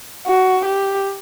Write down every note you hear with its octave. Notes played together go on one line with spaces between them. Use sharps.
F#4
G4